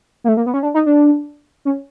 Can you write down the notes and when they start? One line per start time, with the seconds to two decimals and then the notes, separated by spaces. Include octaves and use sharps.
0.24 A#3
0.28 A3
0.37 A#3
0.46 B3
0.54 C#4
0.63 D4
0.74 D#4
0.86 D4
1.65 C#4